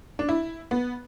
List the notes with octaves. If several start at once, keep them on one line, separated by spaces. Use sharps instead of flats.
D4
E4
B3